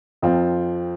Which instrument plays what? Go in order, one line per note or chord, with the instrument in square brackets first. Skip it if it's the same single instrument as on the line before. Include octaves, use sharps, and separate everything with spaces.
[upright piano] F2 F3 C4 F4